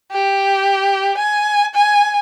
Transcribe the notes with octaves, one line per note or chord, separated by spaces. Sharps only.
G4
G#5
G#5